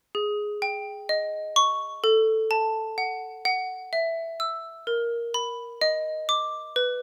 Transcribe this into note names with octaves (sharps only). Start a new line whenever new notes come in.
G#4
G5
D#5
C#6
A4
A5
F#5
F#5
E5
E6
A#4
B5
D#5
D6
B4